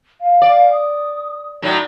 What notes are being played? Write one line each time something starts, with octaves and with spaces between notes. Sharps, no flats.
F5
D5
D#6
A2 F#3 D#4 D5